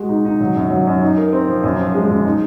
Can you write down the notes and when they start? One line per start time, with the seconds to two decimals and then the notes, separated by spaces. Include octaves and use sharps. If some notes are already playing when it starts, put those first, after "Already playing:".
Already playing: G#3 F#4
0.09 D#4
0.25 D#4
0.41 F#3
0.56 F#2
0.71 F#3
0.87 F#2
1.02 D#4
1.17 A#4
1.33 C4
1.48 F3
1.64 F#2
1.79 F3
1.95 G#3
2.10 F#2
2.25 D#4